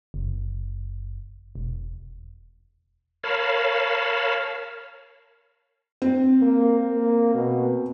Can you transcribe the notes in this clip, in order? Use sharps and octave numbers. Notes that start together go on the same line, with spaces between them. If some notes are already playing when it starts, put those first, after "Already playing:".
F#1
E1
A#4 C#5 F5 A5 B5
C4
A#3
A#3
B2